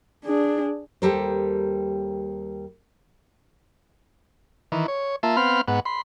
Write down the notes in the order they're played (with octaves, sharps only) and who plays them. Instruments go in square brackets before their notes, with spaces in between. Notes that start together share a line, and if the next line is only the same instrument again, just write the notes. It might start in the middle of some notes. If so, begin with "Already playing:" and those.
[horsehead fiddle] D4 G#4
[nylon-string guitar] D#2 G3 G4 A4 A#4 C5
[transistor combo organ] D#3 E3
C#5
A#3 F4 E5 A5
B3 C4 F5 B5 C6 F6
G#2 B3 F#5
B5 C6